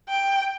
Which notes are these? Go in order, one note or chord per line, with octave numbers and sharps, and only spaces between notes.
G5